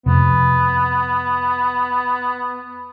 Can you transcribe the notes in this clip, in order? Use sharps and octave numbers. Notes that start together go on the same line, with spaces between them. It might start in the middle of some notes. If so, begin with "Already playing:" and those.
F2 C3 B3